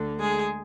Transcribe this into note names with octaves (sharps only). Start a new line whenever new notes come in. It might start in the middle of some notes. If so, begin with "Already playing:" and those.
Already playing: D2 D3
G#3 G#4